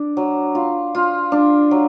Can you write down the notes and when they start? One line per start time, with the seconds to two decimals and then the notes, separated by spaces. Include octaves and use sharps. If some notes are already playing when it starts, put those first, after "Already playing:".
Already playing: D4
0.17 F#3
0.55 F4
0.95 F4
1.32 D4
1.71 F#3